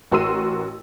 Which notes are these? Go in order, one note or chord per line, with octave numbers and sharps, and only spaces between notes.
A1 F#4 A#4 C6 E6 D#7